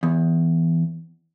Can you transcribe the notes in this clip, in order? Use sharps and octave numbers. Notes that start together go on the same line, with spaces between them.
E2